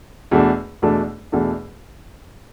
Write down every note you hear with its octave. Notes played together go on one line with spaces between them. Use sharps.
E2 B2 A3 D4
E2 B2 A3 D4
E2 B2 A3 D4